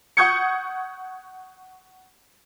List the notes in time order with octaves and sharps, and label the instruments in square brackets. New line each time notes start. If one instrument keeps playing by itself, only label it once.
[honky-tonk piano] F#5 C#6 D#6 G6 G#6 C#7